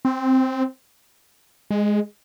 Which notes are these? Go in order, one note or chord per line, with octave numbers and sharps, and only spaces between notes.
C4
G#3